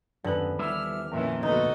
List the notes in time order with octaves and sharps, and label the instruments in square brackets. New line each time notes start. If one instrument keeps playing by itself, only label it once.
[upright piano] D#1 B4 F#7 [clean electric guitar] F#2 [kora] D3 B3
[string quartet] E3 F6 [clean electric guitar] G3 E4 E5
[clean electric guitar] F2 A#2 [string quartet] D#3 E3 C#4 [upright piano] A#4 E5
[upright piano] D2 B3 [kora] D#4 [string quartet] F#4 A4 D#5